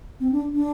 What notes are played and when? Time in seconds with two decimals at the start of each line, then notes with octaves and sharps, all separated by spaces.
0.20 C4
0.32 D4
0.54 D4